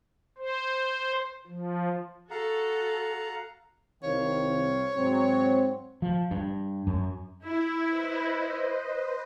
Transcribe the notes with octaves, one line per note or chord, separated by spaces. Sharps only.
C5
F3
F#4 A4 F5 F#5 A#5
C2 D#3 C4 C#5 F5
G#2 F#3 C4
F3
G2
F#2
E4
B4 C5 D#5